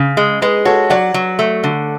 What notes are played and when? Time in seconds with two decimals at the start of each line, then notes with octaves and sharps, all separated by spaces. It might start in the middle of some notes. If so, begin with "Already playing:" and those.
Already playing: C#3
0.17 G#3
0.42 G#3 G#4 B4
0.65 F#4 A4 C#5
0.90 F#3 D5 F#5
1.14 F#3
1.39 A3
1.64 D3